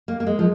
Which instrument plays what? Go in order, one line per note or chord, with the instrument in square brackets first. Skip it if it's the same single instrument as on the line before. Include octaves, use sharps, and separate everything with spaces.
[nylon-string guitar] A#3
A#3
G#3
F3